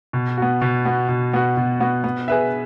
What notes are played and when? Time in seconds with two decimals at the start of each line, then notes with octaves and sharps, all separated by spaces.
0.13 B2
0.38 B3 F#4
0.61 B2
0.85 B3 F#4
1.08 B2
1.33 B3 F#4
1.57 B2
1.80 B3 F#4
2.04 B3
2.28 G#4 B4 E5